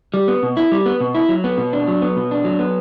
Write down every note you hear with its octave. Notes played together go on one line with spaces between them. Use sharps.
G3
B3
B2
E4
G3
B3
B2
E4
F#3
B3
B2
D4
F#3
B3
B2
D4
F#3
B3